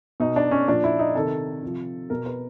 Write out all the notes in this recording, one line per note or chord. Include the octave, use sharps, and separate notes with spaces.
B2 D#4
D4
C#4
A#2 F3 D4
E4
D#4
C3 D#3 A4
C3 F3
B2 A#4
B4